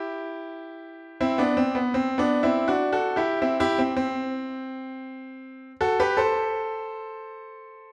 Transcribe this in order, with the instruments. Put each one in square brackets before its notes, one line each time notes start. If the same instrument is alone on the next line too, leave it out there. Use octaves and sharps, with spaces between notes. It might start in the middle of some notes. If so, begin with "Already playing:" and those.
Already playing: [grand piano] E4 G4
C4 E4
B3 D4
C4
B3
C4
B3 D4
C4 E4
D4 F#4
F#4 A4
E4 G4
C4 E4
E4 G4
C4
C4
F#4 A4
G4 B4
A4 C5